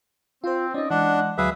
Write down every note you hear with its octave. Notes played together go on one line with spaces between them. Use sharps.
C4 F4 C5
C#4 D#4 D5 D#5
E3 G#3 D4 D#5 F#5
D2 F#3 G#4 B4 E5 F5